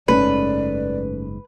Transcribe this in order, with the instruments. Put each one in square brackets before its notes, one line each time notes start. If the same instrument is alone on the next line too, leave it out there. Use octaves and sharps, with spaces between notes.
[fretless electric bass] F#1 G#2 [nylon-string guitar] A3 C#4 [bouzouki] B4 [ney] D5